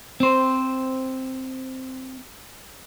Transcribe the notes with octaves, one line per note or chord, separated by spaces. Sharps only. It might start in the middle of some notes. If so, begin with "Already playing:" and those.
C4 C5